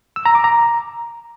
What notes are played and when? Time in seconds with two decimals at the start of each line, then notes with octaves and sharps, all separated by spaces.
0.16 E6
0.26 A#5
0.35 D6
0.44 A#5